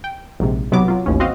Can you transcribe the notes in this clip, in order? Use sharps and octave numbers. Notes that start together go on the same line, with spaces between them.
G5
A#1 G#2 C3
B1 C3 F#3 B3 D6
F#3 F4
A1 D#2 C#4
C4 F#4 D#5 F5